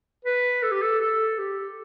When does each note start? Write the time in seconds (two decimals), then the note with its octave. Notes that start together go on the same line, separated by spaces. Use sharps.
0.25 B4
0.63 A4
0.71 G4
0.82 A4
1.01 A4
1.38 G4